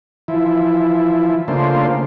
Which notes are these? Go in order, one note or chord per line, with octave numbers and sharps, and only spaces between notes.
E3 F3 E4
C#3 A3 A#3 D4 F4 C5